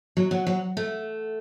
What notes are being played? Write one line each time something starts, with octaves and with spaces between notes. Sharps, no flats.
F#3
F#3
F#3
A3